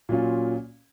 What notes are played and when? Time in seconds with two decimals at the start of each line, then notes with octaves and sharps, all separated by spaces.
0.09 A#2 F#3 C#4 F4